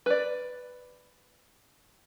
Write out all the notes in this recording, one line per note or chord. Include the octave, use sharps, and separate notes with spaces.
B4 D5